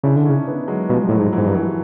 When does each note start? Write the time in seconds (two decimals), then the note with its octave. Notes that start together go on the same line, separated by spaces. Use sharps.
0.03 C#3 D4 E4
0.16 D3
0.25 C#3 C#4 D#4
0.47 B3 C#4
0.68 F#3 G#3
0.89 B2 F3 G3
1.02 G3
1.08 A2 F#3 G#3
1.19 G#2
1.33 G#2 E3 F#3
1.47 G2
1.54 E3 F#3